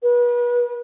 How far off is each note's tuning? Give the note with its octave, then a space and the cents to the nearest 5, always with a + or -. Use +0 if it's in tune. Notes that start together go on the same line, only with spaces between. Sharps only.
B4 -35